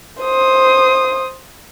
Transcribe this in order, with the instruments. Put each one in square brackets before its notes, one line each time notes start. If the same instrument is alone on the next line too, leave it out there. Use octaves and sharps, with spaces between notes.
[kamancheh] C5 D#6